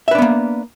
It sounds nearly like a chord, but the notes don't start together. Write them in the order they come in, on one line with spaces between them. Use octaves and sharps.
E5 B4 D4 B3 A#3